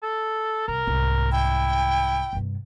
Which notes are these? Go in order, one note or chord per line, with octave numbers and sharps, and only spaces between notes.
A4
C2 A#4
C2 G#2
E4 G5
G2 C3